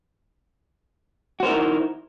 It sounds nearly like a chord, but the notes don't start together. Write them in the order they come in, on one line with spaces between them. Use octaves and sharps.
F#4 C5 A#4 E4 D#4